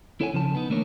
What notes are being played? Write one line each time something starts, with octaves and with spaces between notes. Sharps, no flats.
E4 A4 C#5 F#5 G#5
C#3 F3 A5
B3 D#4
E3 A3 A#3 D4 A#4 C#5